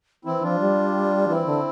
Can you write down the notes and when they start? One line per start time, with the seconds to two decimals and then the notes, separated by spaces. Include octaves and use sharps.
0.25 E3 C4 E4
0.42 F3 D4 F4
0.60 G3
1.29 E3 C4 E4
1.46 D3